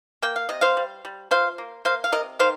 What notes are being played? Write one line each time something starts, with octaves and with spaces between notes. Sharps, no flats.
A#3 G5
F5
C3 D#5
C5 F5
G3
G3
F3 C5 F5
A#3
A#3 C5 F5
F5
C3 A#4 D#5
D#3 C5 F5